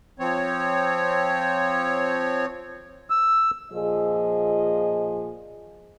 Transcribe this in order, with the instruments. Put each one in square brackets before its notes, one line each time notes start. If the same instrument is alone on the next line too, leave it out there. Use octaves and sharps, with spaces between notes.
[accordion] F3 C4 C#5
E6
[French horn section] A#2 F3 G#4 D#5